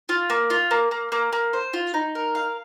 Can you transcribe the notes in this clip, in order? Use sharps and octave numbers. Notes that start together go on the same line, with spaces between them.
F4
A#3
F4
A#3
A#3
A#3
A#3
C5
F4
D#4
A#4
F5